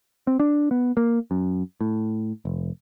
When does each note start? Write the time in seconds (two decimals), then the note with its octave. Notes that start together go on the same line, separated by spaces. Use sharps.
0.27 C4
0.40 D4
0.71 B3
0.97 A#3
1.31 F#2
1.81 A2
2.45 F1